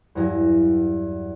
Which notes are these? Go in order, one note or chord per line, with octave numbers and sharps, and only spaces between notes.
E2 G2 E3 F#3 A#6